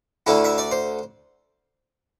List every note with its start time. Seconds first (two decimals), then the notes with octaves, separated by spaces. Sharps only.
0.27 D2 D3 A3 E4
0.45 E5
0.58 D5
0.71 C5